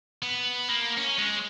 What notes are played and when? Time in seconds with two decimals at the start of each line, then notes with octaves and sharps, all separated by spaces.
0.22 B3
0.68 A#3
0.98 C#4
1.18 G#3